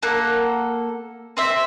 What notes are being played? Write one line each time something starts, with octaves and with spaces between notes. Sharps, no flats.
A#3 A4 F#5
C4 C5 E5